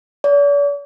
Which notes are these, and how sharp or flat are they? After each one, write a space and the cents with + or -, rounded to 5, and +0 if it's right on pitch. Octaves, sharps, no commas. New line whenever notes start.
D5 -45